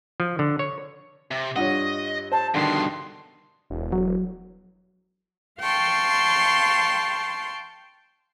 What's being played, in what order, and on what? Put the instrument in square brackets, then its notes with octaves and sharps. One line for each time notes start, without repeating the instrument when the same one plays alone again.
[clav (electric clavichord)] F3
D3
C#5
[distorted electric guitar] C3
[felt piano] G2 F4 C#5 [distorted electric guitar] D#5 [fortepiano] F#5 D#6
[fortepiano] C5 [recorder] A5
[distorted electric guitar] G2 B2 [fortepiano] D3 D#3 A5 [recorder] C6
[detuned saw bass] E1
[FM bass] F#3
[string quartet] F5 G5 A5 C6 C#6